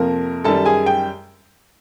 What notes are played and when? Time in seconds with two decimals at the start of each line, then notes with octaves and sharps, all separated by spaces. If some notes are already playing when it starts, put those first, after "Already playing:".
Already playing: F2 C3 F3 A#3 A#4
0.44 F#2 D#3 G3 A4 A5
0.65 G#4 G#5
0.86 G5